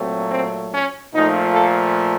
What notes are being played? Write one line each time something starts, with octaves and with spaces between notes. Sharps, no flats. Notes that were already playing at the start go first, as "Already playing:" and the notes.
Already playing: A#2 F#3 A3 C4
C4
C#4
A#2 F3 A3 D#4
A4